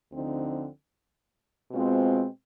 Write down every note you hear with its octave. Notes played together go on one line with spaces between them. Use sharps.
D2 D3 F3 C4 D#4
B2 G#3 C4 F4